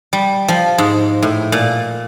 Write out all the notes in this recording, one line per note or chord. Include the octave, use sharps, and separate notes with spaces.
G3
F3
G#2
A2
A#2